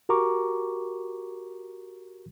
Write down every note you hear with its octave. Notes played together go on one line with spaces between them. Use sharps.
F#4 G4 A#4 A#5 C#6 D6